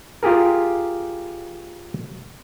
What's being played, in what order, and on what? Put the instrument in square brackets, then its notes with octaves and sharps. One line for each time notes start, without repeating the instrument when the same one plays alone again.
[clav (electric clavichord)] F4 G4 G#4 A#4